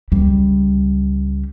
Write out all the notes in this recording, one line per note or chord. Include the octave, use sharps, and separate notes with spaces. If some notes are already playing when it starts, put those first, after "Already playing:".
C#2 G3